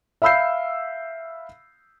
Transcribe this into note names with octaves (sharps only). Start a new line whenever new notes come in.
E5 F5 B5 E6 G6 C7